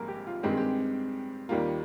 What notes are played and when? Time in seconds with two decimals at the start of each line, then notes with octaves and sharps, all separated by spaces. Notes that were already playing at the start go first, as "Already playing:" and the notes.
Already playing: A#1 G#2 G3 A#3 A#4
0.08 G4
0.27 F4
0.43 G2 D#3 G#3 C4 G4
0.50 G#4
0.57 G4
1.49 D#2 D#3 G3 A#3 F4